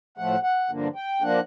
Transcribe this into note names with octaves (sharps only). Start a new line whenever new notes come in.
A2 F3 A3 F#5
F#5
G2 D3 F3 A#3 D4
G5
F3 A#3 D4 F#5